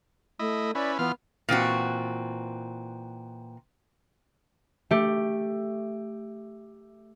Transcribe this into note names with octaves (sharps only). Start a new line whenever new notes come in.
A3 E4 D#5
C#4 E4 B4 D5
E3 B3 F4 F6
A#2 E3 C4 F#4
A3 G4